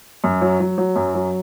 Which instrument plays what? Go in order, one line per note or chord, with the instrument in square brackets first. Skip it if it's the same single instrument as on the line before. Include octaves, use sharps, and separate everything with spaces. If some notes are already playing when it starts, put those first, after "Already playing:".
[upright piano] F#2
F#3
F#3
F#3
F#2
F#3